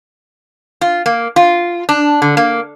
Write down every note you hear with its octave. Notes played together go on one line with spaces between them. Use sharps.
F4
A#3
F4
D4
D3
A#3